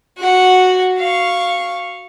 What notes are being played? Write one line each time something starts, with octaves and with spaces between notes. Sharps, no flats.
F#4 F#5
F5 C#6